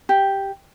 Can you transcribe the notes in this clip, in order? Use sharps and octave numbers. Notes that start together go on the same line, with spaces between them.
G4